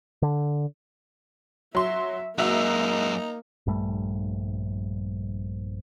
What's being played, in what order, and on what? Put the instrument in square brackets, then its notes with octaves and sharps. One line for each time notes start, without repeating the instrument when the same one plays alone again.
[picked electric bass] D3
[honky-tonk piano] F#3 C6 [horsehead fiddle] E5
[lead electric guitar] F#2 G#3 [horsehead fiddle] A#3 [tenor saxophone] D#4 [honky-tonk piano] F#4 E5
[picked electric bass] A#1 G2 G3 A3